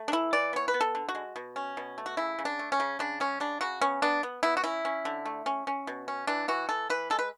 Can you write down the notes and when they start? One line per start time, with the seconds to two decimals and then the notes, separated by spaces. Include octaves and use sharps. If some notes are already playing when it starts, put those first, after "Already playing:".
Already playing: A3
0.08 D4
0.12 E3 E4
0.33 E3 D5
0.53 B3 C#5
0.68 B4
0.74 B3
0.81 A4
0.95 D3
1.09 F#4
1.15 G#3
1.36 B2
1.56 C#4
1.77 B2
1.98 A3
2.06 F#4
2.17 C#3 E4
2.39 C#3
2.45 D4
2.59 A3
2.72 C#4
2.80 C#3
2.99 C#3 D4
3.20 G#3 C#4
3.40 C#3 D4
3.61 C#3 F#4
3.81 B3 C#4
4.02 B3 D4
4.23 B3
4.43 B3 E4
4.57 F#4
4.64 C#4 E4
4.85 C#4
5.05 D3
5.25 A3
5.46 C#4
5.67 C#4
5.87 B2
6.08 C#4
6.27 E3 D4
6.48 E3 F#4
6.69 E3 A4
6.90 E3 B4
7.10 G#3 A4
7.19 B4